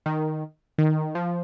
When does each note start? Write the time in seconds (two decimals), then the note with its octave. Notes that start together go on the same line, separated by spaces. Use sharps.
0.06 D#3
0.78 D#3
1.15 F3